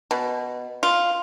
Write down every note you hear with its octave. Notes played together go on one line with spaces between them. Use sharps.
B2
F4